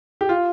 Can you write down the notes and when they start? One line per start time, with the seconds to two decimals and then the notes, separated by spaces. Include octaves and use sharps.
0.21 G4
0.29 F4